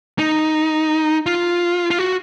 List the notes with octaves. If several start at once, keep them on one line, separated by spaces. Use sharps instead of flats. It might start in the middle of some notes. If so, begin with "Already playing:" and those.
D#4
F4
F4
F#4